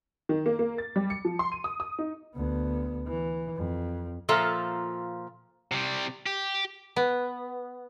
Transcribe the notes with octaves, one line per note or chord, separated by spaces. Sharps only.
D#3
A#3
A#3
A6
G3
C#7
F3
C6
D#7
D#6
D#6
D#4
D2 B3
E3
F2
A#2 F3 F4 A4 E5 A#5
C3 G3
G4
B3